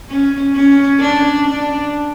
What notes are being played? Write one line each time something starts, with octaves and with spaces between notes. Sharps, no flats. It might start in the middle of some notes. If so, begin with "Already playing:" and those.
C#4
C#4
D4
D4